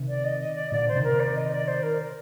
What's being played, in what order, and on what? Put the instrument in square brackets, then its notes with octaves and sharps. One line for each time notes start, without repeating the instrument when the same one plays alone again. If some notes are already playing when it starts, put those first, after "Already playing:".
Already playing: [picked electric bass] C3 D#3
[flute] D5
D#5
D#5
D5
[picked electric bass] A#2 D3 [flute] D5
[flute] C5
[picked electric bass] C3 D#3
[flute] A#4
D5
D#5
D5
C5
A#4